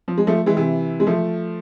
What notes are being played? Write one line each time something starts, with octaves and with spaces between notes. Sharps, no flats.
F3
G#3
F3 A3
E3 G#3
C3 E3
G#3
F3 A3